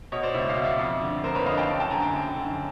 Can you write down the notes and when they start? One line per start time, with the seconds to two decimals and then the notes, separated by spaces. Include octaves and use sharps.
0.12 B2 C#5 D#5
0.23 C5 D5
0.34 C#2 D5 E5
0.49 D#5 F5
0.57 B2
0.64 D5 E5
0.79 F2
1.02 D3
1.24 F2 A#4 C5
1.35 B4 C#5
1.46 D3 D#5 F5
1.57 G5 A5
1.69 F#2
1.80 G5 A5
1.91 D3 G#5 A#5
2.02 G5 A5
2.14 F#2
2.36 D3